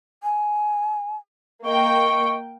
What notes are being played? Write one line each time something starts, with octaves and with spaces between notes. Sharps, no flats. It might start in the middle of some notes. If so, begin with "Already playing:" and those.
G#5
A#3 D#5 G5 C#6